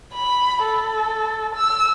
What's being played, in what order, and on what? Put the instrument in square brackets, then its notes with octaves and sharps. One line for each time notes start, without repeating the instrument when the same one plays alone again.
[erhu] B5
A4
E6